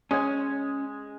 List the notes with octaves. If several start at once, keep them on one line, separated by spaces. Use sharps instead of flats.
G#3 C#4 G#5